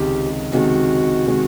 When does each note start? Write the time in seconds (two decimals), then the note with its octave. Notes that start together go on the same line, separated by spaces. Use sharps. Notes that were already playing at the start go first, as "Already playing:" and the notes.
Already playing: C#2 C3 D#3 G#3 G4
0.52 C#2 C3 D#3 G#3 F#4
1.26 C3 D#3 G#3